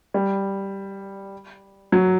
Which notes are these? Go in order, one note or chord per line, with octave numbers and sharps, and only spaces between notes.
G3
F#3